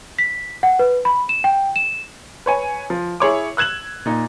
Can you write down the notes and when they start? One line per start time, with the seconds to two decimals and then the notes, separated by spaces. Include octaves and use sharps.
0.19 B6
0.63 F#5
0.79 B4
1.05 B5
1.29 E7
1.44 G5
1.76 E7
2.46 B4 C#5 G#5
2.90 F3
3.20 E4 G#4 C#5 D6
3.57 E6 F#6 G#6 E7 F#7
4.06 A#2 D#4